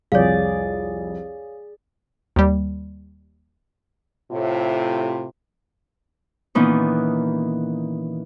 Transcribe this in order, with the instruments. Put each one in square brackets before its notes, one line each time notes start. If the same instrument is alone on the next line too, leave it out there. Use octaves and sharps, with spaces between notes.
[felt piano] C2 F2 [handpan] G#4 D5 [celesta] C#5 F5
[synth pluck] D#2 G3
[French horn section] A2 C3 F4
[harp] A#2 D#3 E3 B3 C#4 D#4